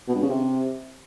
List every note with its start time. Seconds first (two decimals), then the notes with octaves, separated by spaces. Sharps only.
0.08 B2
0.15 G2
0.22 C#3
0.29 C3